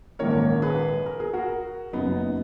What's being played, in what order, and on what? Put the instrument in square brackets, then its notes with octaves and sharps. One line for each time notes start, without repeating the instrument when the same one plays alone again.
[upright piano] A#1 G#2 D#3 A#3 C#4 [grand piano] A#4 C#5
[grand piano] G#4 B4
A#4
G#4
F#4 A#4
[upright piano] F#1 F#2 C#3 F#3 [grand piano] B3 D#4